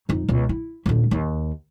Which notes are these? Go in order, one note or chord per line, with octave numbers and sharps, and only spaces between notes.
F2 D#4
C#2 B2
E4
D#1 D3
D#2